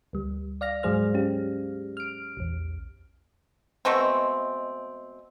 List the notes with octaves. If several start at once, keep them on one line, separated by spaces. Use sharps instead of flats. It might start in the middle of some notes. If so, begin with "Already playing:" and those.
D2 G3
D5 F5 F6 A#6
G#2 F#3 G#3 G#4 C5 F6
C#4 G4
F6 D7
A#1 E2
B2 G#3 A3 C4